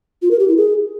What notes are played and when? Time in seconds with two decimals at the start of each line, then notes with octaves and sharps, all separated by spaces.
0.22 F4
0.31 A#4
0.39 G4
0.48 E4
0.56 G#4